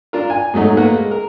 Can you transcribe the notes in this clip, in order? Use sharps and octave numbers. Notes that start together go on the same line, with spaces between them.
D4 F4 A#4
G#5
G#2 F#3 A3 D#4
A3 A#3 B4 F#5
G#3
A#4